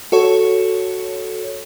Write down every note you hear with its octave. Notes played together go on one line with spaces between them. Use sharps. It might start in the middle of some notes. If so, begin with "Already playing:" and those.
F#4 A4 C#5